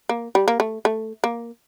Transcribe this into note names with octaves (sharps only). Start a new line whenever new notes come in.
A#3
G3
A#3
A3
A3
A#3